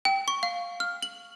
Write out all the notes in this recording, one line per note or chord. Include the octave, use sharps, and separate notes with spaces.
G5
C#6
F5
F6
F#7